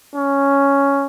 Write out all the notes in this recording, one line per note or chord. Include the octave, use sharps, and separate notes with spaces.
C#4